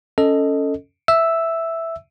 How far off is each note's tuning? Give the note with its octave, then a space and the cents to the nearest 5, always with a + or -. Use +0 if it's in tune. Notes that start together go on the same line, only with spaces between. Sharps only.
C#4 +0 A4 +10 D#5 +0
E5 +0 E6 +0